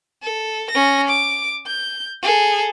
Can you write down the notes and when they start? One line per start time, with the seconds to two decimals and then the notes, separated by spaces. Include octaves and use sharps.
0.23 A4
0.71 C#4 A#6
1.08 D6
1.67 G6
2.23 G#4 A4